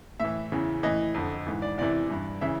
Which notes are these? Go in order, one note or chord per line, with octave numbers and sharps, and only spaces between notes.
A2 E3 E5
E2 C#3 E3
A2 E3 D#5
F2 D3
G#2 E3
D5
E2 C3 E3 D5
G2 E3
C#3 E3 E5